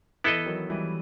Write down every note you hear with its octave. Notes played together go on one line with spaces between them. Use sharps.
E3 B3 E4 A4 D#5
D#3 F#3
E3 G3